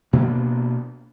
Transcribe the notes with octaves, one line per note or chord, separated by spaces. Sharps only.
B2 A#3 B3 D4